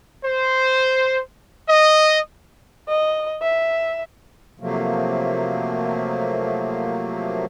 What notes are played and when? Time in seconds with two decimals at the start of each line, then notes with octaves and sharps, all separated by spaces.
0.25 C5
1.69 D#5
2.88 D#5
3.42 E5
4.60 C3 F3 F#3 A3 A#3